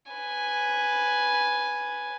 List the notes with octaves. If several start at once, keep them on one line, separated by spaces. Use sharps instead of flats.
B4 G#5